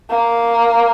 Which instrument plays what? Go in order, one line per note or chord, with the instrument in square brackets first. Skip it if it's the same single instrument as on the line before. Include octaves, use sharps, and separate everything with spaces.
[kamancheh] A#3